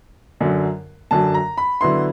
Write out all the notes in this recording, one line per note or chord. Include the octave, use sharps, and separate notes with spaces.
F#2 D3 F#3
F#2 D3 F#3 A5
A#5
B5
D3 F#3 B3 E4 C6